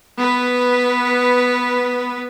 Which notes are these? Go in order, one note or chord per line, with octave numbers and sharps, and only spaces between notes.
B3 B4